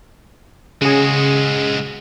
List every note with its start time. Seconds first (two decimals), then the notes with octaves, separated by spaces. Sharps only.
0.82 C#3 G#3 F#4 G#4